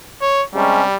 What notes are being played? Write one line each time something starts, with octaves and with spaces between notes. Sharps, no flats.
C#5
C3 G3 G#3 C#4